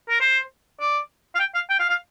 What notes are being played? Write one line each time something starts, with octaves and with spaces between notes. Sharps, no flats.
A#4
C5
D5
F5
G5
F5
G5
F5
F5